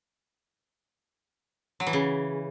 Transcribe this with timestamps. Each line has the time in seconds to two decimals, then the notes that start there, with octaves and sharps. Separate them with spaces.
1.80 F#3
1.87 E3
1.93 C#3